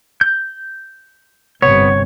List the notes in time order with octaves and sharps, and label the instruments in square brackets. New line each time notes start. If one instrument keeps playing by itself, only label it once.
[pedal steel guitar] G6
[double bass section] G1 C3 [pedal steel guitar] B3 [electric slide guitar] C#5